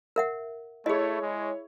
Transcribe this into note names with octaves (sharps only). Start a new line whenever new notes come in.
A#4 E5 F#5
A3 E4 G#4 C#5 D#5
G#3